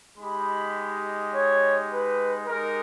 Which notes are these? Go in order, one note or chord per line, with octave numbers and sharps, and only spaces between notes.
G#3 D#4 G4 B5
C#5
B4
G#3 D#4 G4 A#4